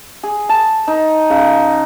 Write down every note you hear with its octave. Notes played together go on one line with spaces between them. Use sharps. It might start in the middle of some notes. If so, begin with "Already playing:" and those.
G#4
A5
D#4
C#3